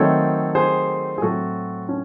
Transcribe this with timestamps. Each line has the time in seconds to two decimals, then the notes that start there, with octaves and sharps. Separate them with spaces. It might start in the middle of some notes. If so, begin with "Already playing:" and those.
Already playing: D#3 F#3 A3 C4 A4 C#5
0.55 G#4 C5
1.18 G#4
1.22 A2 F#3 A3 C4 F#4 A4
1.89 C#4